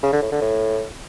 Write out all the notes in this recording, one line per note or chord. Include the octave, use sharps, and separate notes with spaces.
C#3
D3
A2
D3
A2